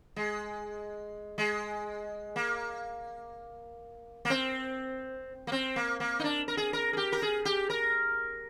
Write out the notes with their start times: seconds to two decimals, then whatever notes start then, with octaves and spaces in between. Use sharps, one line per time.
0.16 G#3
1.38 G#3
2.36 A#3
4.25 A#3
4.30 C4
5.47 A#3
5.52 C4
5.76 A#3
6.00 A#3
6.19 D#4
6.24 D4
6.48 A#4
6.57 G#4
6.73 A#4
6.93 G#4
6.97 G4
7.12 A#4
7.22 G#4
7.45 G4
7.70 A#4